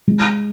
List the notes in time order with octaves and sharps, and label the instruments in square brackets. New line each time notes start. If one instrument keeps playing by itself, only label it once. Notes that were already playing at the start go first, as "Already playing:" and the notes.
[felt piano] G#3